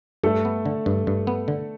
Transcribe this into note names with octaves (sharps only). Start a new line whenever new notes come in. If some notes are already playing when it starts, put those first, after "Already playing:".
G2 A3 A4
B3
D3
G2
G2
B3
D3